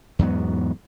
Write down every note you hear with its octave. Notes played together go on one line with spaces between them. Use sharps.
E2 G#2 F#3 B3